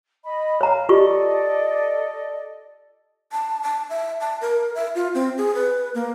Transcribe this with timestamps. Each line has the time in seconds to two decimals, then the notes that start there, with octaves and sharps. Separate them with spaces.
0.24 D#5 B5
0.61 C#5 F5 A#5
0.89 F4 G4 A4 D5 D#5 C#6
3.32 A5
3.63 A5
3.90 E5
4.21 A5
4.41 A#4
4.75 E5
4.95 F4
5.15 C4
5.38 G#4
5.55 B4
5.95 A#3